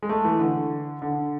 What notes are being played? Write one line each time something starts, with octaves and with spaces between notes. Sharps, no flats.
G#3
A3
E3
D3
D3